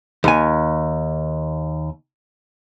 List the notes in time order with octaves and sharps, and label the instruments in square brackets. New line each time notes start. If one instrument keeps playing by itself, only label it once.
[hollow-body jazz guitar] D#2 G#5